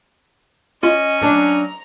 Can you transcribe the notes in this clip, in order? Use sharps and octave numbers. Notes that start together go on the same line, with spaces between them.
C#4 F4 D#5
F#3 D4 A#5